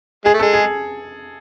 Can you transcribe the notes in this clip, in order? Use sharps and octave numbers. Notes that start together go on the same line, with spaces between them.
G#3 G#4
A3
A4
G#3
G#4